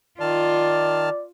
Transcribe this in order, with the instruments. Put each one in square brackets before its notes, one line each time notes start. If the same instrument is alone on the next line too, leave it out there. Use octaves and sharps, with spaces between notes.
[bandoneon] D#3 A5 F6 [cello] F4 [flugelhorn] D5